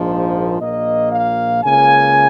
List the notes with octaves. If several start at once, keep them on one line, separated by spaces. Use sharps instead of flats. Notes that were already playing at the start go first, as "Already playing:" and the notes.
Already playing: A#1 G#2 F3
A#1 A#2 A#3 D#5
F5
C#2 C#3 A#3 G#5